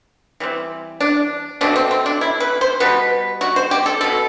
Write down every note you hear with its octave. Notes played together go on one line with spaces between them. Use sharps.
E3 G3 C4
D4
B2 A3 C4 D4
C4
C4
D4
E4
B4
C5
B2 G3 B3 B4
F#4
C5
G4
A4
B2 A3 C4 A4